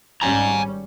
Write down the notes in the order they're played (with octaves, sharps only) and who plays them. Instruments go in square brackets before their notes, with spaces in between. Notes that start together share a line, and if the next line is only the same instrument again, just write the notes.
[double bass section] G#1 G3 C#4 [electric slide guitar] G#5 A#5